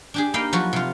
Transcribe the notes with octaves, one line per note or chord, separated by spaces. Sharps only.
D4 G4 G#4
A#3 D#4 D#5 F5 G5 B5
F3 F#3 F#4 B4
C3 F4